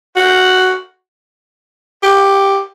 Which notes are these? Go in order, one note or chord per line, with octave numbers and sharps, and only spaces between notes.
F#4
G4